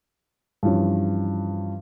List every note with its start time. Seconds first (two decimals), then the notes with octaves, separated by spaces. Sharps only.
0.63 G2 E3 F3 C#4